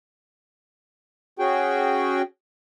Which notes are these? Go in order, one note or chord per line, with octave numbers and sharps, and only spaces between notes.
C#4 F#4 G#4 G5